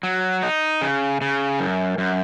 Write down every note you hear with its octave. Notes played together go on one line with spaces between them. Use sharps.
F#3
D#4
C#3
C#3
F#2
F#2